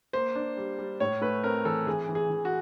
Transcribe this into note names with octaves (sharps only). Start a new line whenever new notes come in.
A#3 C5
D4
G3
G3
A2 C#5
A3 B4
C4 A#4
E3 A4
E3 G#4
E3
G#4
E3
F#4